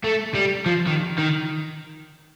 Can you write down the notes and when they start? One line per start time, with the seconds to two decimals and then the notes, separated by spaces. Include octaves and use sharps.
0.04 A3
0.34 G3
0.66 F3
0.87 D#3
1.18 D#3